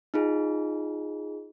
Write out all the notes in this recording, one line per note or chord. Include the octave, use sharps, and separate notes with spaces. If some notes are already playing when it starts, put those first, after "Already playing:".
D#4 F4 G#4